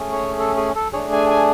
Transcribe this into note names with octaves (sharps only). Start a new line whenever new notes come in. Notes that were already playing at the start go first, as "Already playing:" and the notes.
Already playing: A3 C#4 G#4
C#5
A4
G#4
A4
A3 D4 G#4 C#5
G#5
G#5